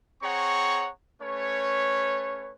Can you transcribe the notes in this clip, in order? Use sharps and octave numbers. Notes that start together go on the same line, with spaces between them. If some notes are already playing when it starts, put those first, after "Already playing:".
C4 G#4 C#5 F#5 A#5 C#6
A3 C#4 B4 C#5